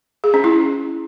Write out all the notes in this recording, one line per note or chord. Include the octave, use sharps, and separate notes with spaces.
G#4
C#4
E4